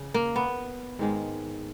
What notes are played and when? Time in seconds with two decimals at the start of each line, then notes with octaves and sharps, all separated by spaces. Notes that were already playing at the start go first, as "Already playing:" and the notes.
Already playing: C#3
0.14 A#3
0.36 B3
0.99 G#2 D#3 G#3